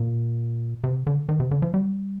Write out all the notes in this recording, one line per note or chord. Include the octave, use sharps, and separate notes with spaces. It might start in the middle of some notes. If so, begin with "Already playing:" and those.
Already playing: A#2
C3
D3
D#3
C3
D3
F3
G3